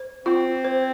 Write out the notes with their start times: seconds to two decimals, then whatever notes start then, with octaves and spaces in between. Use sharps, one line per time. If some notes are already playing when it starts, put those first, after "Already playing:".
Already playing: C5
0.26 C4 F4
0.64 C5